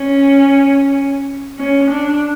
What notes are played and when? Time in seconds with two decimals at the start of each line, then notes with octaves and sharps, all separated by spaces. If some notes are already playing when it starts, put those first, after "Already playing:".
Already playing: C#4
1.59 C#4
1.90 D4